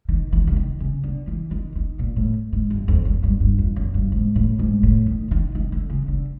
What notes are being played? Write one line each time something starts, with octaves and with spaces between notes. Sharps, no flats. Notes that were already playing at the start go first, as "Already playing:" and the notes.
D#3
E3
D3
D#3
C#3
D3
E3
D#3
D#3
A#2
A2
G#2
G2
F2
F#2
G2
G2
F2
F#2
G2
G#2
A2
G#2
A2
D#3
D#3
D#3
D3
C#3
D3